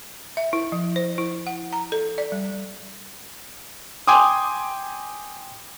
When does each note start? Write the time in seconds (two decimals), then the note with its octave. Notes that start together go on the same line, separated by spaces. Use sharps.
0.37 E5
0.53 E4
0.72 F3
0.96 C5
1.18 E4
1.47 F#5
1.73 A#5
1.92 A4
2.18 D5
2.32 G3
4.08 G5 G#5 C6 D6 D#6